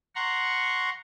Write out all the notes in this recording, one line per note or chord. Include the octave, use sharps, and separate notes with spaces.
F#5 A#5 C6 C#6